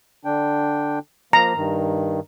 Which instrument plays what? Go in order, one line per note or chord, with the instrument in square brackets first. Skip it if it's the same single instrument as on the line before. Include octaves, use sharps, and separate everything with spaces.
[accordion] D3 D4 G5
[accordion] F3 A#3 [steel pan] A#5
[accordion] G2 D#3